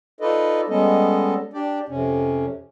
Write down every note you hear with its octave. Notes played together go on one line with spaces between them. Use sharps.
D#4 F4 A4 B4 D5 D#5
G3 G#3 B3 C#4 A4 D#5
D4 G4 D5
F2 C3 C#4